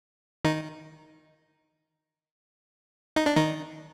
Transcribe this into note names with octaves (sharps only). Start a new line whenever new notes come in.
D#3 D#4
D#4
D4
D#3 D#4